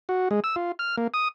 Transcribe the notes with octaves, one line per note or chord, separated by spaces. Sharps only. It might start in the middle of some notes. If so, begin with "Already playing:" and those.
F#4
G#3
E6
F4
F6
A#3
D#6